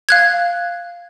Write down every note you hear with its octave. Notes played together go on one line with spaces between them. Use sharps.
F5 F#6 G#6